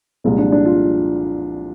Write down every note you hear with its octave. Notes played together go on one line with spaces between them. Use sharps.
C2 A#2 F3 G#3
D4
D4
F4